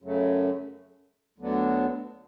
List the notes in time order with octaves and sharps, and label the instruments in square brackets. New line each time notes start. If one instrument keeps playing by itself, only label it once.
[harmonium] F#2 C#3 F#3 A3
D2 D3 F#3 B3 D4